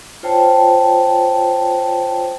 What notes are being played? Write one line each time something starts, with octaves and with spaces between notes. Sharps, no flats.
F4 C5 C#5 G5 A5